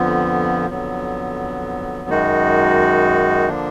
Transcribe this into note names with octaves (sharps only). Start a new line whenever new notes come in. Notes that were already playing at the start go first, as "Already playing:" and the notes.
Already playing: F2 D3 F3 B3
F2 D3 F#3 B3
F#2 D#3 G#3 D#4 F#4
D3 F3 A#3 D4